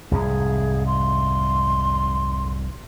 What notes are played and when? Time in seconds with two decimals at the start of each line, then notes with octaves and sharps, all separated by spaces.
0.12 C2 F2 G#2 G#4
0.87 C6